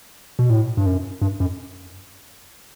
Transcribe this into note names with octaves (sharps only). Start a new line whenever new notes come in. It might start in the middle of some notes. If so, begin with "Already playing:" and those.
B2
A2
G2
F#2
G2
F#2